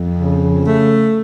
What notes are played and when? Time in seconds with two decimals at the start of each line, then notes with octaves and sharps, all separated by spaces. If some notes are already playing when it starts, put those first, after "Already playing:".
Already playing: F2
0.19 C#3
0.65 A3